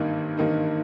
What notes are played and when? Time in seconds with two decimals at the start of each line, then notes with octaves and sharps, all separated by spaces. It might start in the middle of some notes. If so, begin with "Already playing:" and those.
Already playing: G#1 G2 D#3 A#3 D#4
0.37 G#1 G2 D#3 A#3 D#4